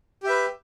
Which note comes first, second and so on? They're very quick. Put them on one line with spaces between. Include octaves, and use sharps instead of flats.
G4 E5 B4